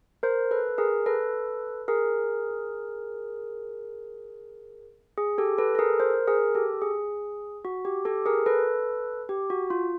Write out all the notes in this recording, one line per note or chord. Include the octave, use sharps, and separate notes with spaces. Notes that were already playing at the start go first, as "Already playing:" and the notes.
A#4 C5
A4 B4
G#4 A#4
A4 B4
G#4 A#4
G#4
G4 A4
A4 B4
A4
G#4 A#4
A#4 C5
G#4 A#4
G4 A4
G#4
F#4
G4
G4 A4
G#4 A#4
A4 B4
G4
F#4
F4